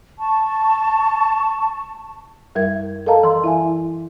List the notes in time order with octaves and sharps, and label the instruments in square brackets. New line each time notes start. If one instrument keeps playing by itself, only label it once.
[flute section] A5 C#6
[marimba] F#2 G3 A#4 E5 G#6
A4 A#4 D#5 F5 A5 A#5
E3 C6
E4 E5 G#5